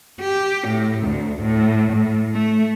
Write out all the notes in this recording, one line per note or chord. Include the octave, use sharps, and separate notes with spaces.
G4
A2
D2
A2
A2
A3